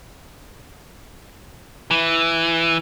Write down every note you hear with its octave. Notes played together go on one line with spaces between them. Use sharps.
E3